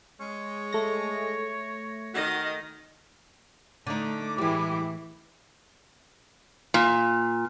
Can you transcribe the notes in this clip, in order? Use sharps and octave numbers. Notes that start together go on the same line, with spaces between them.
G#3 C#5
A3 A#6
D#3 F#4 D#5
D3 A3 D#4 D6
A2 E3 G3 G#3 E4 G4
A#2